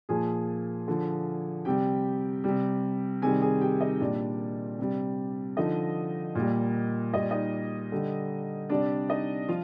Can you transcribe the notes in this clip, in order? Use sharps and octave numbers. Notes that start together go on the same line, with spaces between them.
A#2 F3 G#4 G#5
D3 F3
C3 G3 G4 G5
C3 G3
C3 D#3 G3 G#4 G#5
G#4 G#5
G4 G5
D#4 D#5
A#2 G3 D4 D5
C3 G3
D3 F3 D#4 D#5
A#2 G3
A#2 G3 D#5
D5
D#4 D#5
D3 G3
C3 G3 D4 D5
D#4 D#5
F3 F4 F5